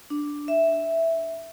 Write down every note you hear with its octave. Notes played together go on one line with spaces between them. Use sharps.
D4
E5